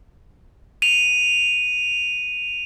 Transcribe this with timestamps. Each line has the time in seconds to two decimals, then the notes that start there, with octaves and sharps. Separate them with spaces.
0.82 D#7 F7